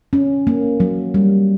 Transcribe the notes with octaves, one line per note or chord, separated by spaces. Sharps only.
C#4
A#3
F#3
G3